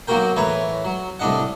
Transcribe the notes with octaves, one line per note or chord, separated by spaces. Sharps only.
B1 F#3 A#3 F#4 A#4 G5
A2 E3 B4 C#5 A#5
F#3
C2 A2 D4 D#5 F#5